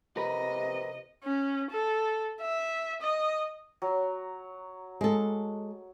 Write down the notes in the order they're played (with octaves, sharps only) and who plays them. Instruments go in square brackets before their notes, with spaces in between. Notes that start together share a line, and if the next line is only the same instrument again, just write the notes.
[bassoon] C3 [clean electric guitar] A#4 B4 [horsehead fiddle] D#5
[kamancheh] C#4
A4
E5
D#5
[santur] F#3
[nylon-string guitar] G#3 A4